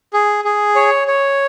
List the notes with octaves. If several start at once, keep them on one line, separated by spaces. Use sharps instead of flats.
G#4
G#4
C#5
C#5